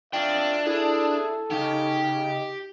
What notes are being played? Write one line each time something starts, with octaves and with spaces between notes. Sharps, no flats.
D4 F4 E5 G5
E4 G#4 A4
C#3 D#4 G4